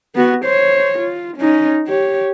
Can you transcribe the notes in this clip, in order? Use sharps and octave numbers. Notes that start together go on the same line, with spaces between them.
B3 F#4
C5 C#5
F4
C#4 D#4
G4 C#5